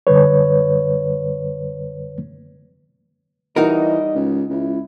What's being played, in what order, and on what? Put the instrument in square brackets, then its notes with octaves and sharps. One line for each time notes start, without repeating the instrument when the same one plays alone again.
[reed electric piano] F#2 D3 G3 B4 C#5
[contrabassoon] E3 [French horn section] G3 D#5 [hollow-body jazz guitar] D#4 F#4 A#4
[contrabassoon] C#2
[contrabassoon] C#2 [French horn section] E4